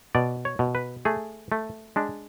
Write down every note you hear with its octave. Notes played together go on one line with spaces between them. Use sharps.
B2 D5
C#5
B2
B4
A3 G#4
A3
G#3 D4